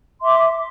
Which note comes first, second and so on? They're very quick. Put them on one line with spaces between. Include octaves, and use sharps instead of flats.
C6 E5 D6